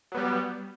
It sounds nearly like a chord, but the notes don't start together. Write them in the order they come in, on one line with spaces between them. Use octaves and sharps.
F#3 B3 G3